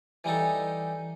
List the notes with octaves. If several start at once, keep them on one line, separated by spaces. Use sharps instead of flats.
E3 G3 D#4 A4